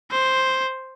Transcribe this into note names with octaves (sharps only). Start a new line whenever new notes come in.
C5